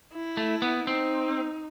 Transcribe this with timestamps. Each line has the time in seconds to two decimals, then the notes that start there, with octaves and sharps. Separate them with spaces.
0.13 E4
0.37 A3
0.62 B3
0.87 C4 D#4